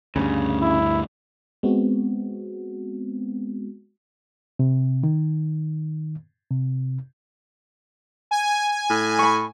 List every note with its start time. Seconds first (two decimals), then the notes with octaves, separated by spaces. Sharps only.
0.16 D2 G2 C#3
0.62 E4
1.63 G#3 B3 C4 F#4
4.59 C3
5.03 D#3
6.51 C3
8.31 G#5
8.90 A2
9.19 B5 C#6